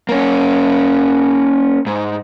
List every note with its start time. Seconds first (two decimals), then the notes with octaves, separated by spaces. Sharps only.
0.09 A#3 C#4
1.87 G#2